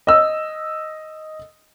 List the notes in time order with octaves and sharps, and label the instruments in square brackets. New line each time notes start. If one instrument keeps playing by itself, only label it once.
[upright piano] D#5 E6